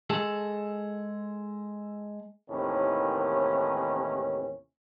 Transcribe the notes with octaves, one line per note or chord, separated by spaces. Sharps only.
G#3 G#4 A4
D#2 A2 C3 D#3 E3 C#4